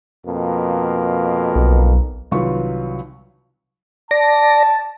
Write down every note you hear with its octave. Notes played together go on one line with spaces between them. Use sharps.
F2 B2 A#3
B1
C2 D#3 F#3 F4 B4 C#6
D5 A5 A#6